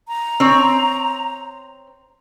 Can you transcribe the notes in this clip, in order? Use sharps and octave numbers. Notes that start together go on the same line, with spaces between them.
A#5
C4 C#5